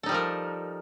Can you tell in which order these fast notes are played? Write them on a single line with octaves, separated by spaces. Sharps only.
A4 D#4 G3 F3 A#4